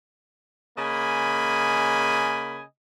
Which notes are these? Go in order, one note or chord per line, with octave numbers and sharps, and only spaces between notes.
C#3 A#3 D#5 G#5 B5